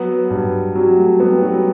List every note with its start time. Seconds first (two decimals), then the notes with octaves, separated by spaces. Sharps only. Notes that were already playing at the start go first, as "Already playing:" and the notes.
Already playing: F#3 B3
0.30 G2
0.75 F#3 G3
0.98 A3
1.20 G3 B3
1.42 F#3